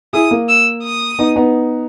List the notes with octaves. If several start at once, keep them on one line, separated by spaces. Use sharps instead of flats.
E4 G#4 D#6
A#3
E6
D#6
B3 D#4
B3 D#4